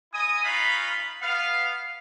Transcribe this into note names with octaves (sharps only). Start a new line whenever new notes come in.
E4 D#5 G#5 D#6
C#4 D#4 F4 B4 F5 B5
B3 F5